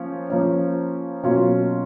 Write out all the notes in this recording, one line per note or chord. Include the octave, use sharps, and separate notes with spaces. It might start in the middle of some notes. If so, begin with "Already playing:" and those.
Already playing: F3 A#3 C#4
F3 A#3 C#4
B2 F#3 A#3 C#4 F4